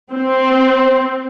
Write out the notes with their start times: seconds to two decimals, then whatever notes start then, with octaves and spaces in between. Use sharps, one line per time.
0.11 C4